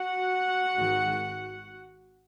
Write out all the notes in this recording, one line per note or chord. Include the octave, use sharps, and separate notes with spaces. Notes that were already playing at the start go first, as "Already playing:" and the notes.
Already playing: F#4 F#5
G#1 G#2 D#3 G#3